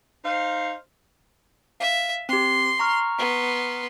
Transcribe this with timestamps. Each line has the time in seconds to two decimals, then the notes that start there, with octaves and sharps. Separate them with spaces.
0.24 D#4 C5 F5
1.80 E5 F5
2.29 C4 G4 C6
2.79 A#5 C#6 F6
3.18 B3 C6